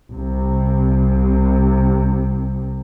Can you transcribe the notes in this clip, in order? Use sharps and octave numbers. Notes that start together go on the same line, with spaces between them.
C2 C3